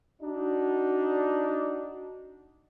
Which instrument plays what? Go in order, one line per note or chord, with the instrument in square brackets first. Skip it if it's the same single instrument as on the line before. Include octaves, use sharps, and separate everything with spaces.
[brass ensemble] D4 D#4 F#4